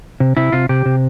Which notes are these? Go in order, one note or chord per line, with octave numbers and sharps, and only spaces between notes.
C3
C3 E4
C3 F4
C3 G4
C3